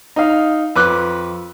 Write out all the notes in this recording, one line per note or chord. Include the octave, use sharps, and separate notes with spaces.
D#4 F5
F2 B4 D6 F#6